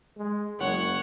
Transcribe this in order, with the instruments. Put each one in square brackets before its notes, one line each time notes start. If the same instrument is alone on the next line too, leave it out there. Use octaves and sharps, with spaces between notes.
[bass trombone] G#3
[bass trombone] F#1 [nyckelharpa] C#5 F#5